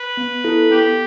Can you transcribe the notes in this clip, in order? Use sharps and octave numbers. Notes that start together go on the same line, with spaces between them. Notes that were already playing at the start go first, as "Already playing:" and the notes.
Already playing: B4
B3
E4 A4
B3 G4